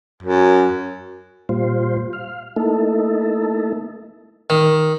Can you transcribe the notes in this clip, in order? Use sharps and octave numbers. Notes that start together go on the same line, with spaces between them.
F#2
A#2 G3 F4 C5
F5
A3 A#3 D#4 E4 A4
D#3